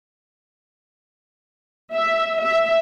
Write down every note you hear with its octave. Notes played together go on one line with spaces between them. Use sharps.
E5
E5